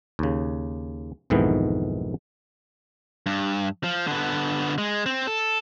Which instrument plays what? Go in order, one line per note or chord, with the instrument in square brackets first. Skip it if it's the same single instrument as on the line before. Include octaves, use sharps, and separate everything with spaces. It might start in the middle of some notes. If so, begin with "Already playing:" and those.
[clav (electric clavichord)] D#2 C#3
B1 F2 G#2 D#3 E3 B3
[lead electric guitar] G2
F3
D3 B3
G#3
C4
A4